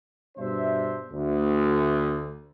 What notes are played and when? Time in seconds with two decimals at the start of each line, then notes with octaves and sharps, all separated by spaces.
0.38 G2 B2 D4 C5 E5
1.12 D2